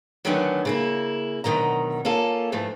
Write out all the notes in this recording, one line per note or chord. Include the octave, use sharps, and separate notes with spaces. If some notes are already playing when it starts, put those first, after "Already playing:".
D3 D#3 F#3 A3 B3 C#4
C#3 A#3 E4
D2 B2 D#3 F#3 A#5
A#3 C#4 F4 A4
G#2 E3 F3 A3